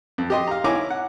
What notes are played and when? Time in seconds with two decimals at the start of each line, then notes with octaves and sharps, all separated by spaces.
0.18 F2
0.30 G4 D#5 C6
0.47 F5 A#5
0.64 E4 C#5 G#5 A#5 C#6 D6
0.90 F#5